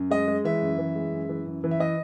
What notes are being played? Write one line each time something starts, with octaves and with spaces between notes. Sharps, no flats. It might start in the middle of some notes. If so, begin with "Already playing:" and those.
Already playing: F#2
G#3 D#5
G#3
E3 E5
F#2
E3
G#3
F#2
E3
F#2
E3
E5
E3 D#5